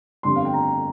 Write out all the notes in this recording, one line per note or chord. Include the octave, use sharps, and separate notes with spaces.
G1 F2 D3 G3 C6
F5
G5
A#5